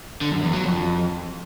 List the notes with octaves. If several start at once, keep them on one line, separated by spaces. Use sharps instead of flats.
D3
F#2
E2
F#3
F2